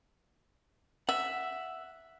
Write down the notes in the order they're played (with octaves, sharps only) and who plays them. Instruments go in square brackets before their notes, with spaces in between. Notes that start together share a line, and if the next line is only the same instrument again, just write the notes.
[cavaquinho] E5 [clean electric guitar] F#5